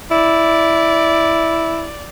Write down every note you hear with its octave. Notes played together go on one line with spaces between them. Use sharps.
E4 D5